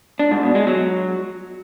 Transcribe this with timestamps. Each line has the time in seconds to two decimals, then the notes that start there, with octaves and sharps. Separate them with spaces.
0.19 D4
0.31 G#2
0.43 B2
0.55 G#3
0.67 F#3